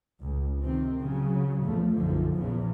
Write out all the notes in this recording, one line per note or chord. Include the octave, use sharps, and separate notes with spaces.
C#2
C3 D#3 C4
C#3 F#3
E2 F3 A3
B1 F#2 D3 F3
A#1 E2 C#3 F3